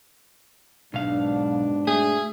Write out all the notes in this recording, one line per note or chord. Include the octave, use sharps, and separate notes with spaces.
B1 G#2 B2 D4 F5
A3 G#4